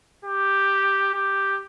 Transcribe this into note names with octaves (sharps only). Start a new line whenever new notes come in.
G4
G4